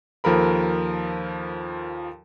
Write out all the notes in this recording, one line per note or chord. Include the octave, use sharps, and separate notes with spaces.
D#2 F3 A4 A#4 B5